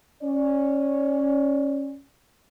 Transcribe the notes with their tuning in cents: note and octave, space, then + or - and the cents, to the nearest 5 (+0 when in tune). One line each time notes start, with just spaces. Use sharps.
C#4 -10 D5 +0